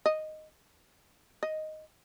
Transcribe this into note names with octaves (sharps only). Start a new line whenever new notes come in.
D#5
D#5